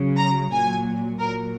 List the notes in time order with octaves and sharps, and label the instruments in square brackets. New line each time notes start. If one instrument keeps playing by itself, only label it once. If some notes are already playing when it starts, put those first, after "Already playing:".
Already playing: [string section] C#3 F#3
A#5
A#2 F#3 G#5
A#2 F#3 A#4